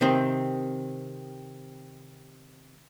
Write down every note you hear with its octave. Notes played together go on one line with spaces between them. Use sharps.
C3 D#3 C4